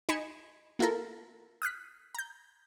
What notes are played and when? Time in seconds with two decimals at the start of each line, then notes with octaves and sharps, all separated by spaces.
0.09 D#4 D#5 G#5 B5 C#7 E7
0.79 A#3 E4 F4 A4 A#4
1.62 D#6 F6 F#6 B6
2.15 A#5 G6